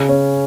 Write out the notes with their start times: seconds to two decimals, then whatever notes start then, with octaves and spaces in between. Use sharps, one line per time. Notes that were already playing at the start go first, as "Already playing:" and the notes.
Already playing: C#3
0.09 C#4